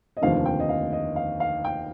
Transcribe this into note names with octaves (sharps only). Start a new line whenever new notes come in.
D#5
F1 D#2 D3 F3 F5
G5
D#5
F5
D#5
F5
F5
G5